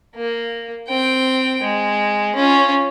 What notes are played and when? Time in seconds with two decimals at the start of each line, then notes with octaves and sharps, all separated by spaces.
0.15 A#3
0.89 C4 G5
1.63 G#3
2.35 C#4 F4